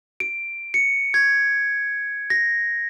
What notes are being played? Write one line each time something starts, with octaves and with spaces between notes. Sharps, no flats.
D7
C#7
G#6
A#6